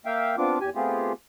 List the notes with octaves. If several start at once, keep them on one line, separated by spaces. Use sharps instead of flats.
A#3 E5 F5 G5
B3 C4 D4 F4 D6
E2 G4 G#5
A3 B3 C4 F4 G4 G#4